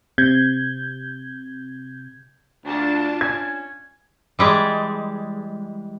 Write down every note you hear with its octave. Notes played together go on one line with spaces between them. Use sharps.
C3 G6 G#6
D2 D4 F4 A5
C#4 G#6
E3 G3 G#3